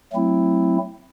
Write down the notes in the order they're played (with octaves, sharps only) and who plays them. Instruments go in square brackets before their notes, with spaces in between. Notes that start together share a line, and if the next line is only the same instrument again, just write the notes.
[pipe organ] F#3 A3 C4 E4